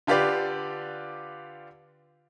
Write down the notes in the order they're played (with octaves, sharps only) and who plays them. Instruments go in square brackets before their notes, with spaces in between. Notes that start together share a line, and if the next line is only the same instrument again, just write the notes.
[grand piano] D3 F4 G4 B4 D5